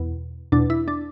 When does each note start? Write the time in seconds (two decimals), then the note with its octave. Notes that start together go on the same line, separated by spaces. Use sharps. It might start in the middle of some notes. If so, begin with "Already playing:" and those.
Already playing: E2 B2
0.52 E2 B2 D4
0.70 E4
0.88 D4